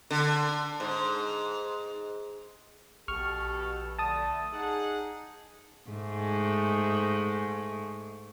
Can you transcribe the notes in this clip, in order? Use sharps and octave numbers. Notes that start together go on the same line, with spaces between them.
D3
G#2
A#1 B2 G4 A4 C#6 F6
D3 A3 A5 D#6
D#4 G#4 F#5
G#2 A3